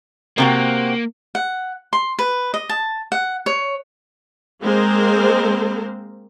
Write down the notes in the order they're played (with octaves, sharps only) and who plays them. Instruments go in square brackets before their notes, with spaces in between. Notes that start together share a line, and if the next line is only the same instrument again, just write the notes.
[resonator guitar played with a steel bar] C3 C4 F#4 [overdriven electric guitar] A#3
[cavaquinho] F#5
C6
B4
D#5
A5
F#5
C#5
[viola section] G#3 A#3 C4 A#4 C5